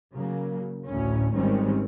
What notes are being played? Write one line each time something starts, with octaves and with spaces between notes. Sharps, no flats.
C#3 F#3 A#3
A1 D2 A2 C#4
G#1 D#3 G3 G#3 C4 C#4